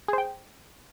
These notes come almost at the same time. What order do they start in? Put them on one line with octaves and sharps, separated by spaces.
G#4 C5 G5